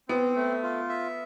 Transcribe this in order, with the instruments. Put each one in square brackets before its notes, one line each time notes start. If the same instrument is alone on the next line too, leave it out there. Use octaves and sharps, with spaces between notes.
[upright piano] B3 [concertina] C4
[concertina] A3
F4
E5